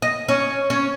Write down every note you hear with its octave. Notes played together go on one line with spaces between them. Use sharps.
D#5
C#4
C#4